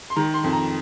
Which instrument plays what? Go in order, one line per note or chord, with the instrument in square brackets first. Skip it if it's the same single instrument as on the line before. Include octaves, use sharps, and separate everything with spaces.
[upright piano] C6
D#3 A#5
C6
F2
A#5